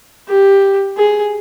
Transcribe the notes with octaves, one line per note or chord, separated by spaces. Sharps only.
G4
G#4